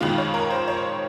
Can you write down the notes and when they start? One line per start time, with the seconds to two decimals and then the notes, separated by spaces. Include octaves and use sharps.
0.01 F2 D#3 G#3 F4
0.18 C#5
0.34 A#4
0.50 C5
0.68 C#5